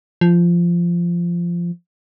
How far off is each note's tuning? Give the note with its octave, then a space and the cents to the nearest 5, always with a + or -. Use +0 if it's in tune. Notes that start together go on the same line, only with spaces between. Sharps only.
F3 -15